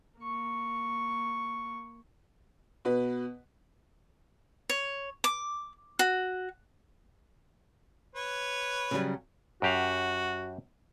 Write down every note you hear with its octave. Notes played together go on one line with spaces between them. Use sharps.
A#3 C#6
B2 B4
C#5
D6
F#4
B4 C#5
C#3 F#3 G3
F#2 F#4 G4 F5